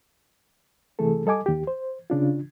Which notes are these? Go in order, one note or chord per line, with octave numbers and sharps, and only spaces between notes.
C3 E3 A3 G#4 A4
G3 A4 D#5 G#5 D6
D#2 G4
C5
C#3 D4 F4